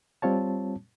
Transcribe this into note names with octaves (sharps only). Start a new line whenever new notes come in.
G3 C4 F4 C#5 A5